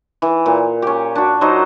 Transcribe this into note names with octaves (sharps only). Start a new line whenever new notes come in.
E3
A#2
C#4 G4
D4 F#4
F#3 D#4 C5 D#5